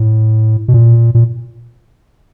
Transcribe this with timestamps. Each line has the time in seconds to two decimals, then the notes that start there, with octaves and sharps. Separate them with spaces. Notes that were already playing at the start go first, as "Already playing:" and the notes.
Already playing: A2
0.68 B2
0.74 A#2
1.15 A#2